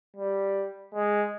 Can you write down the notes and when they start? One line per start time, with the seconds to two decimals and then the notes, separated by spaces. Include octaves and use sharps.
0.16 G3
0.95 G#3